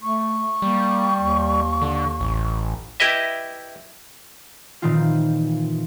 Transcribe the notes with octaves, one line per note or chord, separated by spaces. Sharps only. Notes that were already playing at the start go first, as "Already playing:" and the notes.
A3 C#6
G3 A#3
D#2
D3
A1
E4 G4 B4 D#5 E5
A#2 D#3 E3 C4 F4